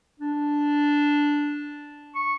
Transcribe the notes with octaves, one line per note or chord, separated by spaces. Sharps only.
D4
C#6